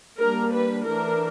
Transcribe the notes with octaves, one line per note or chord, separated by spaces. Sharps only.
G3 A#3 D4 A#4
B4
E3 A3 D4 A#4